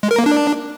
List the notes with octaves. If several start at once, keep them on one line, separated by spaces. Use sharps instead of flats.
G#3
A#4
A#3
D4